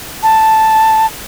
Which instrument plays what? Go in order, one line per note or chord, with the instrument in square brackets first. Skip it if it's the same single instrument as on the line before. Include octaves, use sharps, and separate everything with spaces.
[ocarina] A5